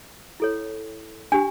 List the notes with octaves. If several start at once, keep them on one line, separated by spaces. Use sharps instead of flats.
E4 A4 C#5
D4 G4 G#5